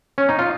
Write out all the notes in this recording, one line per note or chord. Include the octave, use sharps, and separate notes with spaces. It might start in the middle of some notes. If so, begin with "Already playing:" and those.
C#4
D#4
F4